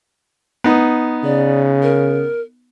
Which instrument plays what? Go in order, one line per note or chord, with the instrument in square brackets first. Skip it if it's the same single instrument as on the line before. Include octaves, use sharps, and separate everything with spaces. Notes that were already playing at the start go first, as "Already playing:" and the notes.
[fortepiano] B3 D#4
[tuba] C#3 [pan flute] D5
[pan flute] A#4